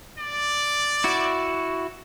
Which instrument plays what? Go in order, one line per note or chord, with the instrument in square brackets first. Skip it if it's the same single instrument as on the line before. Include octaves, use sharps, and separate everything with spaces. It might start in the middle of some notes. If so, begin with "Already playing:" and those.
[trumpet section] D5
[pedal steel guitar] E4 F#4